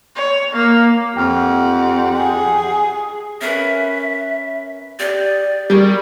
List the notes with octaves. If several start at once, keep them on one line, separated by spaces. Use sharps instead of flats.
C#5
A#3
F2 G4 F#5 G5 F6
G#4
C#4 A#4 B4 E5
G4 D5 D#6
G3 G#4 A#4 C#6